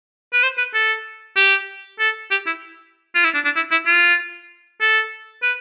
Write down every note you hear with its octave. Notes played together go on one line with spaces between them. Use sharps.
B4
C5
B4
A4
G4
A4
G4
E4
F4
E4
D4
D4
E4
E4
F4
A4
B4